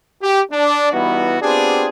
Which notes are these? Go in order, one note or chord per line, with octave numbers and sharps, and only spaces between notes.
G4
D4
E3 G3 B3 D#4 E4 F#4
B3 C4 D4 F4 G4 G#4